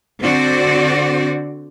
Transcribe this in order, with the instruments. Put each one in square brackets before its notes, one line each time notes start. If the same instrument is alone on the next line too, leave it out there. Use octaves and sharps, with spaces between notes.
[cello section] D3 C4 F#4 C5 D5